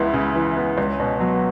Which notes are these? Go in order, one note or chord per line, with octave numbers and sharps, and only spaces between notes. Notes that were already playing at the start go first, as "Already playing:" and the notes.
Already playing: C#2 C#3 E3 B3 E4
C#3
E3
B3
C#2 C#4
B2
F#3 B3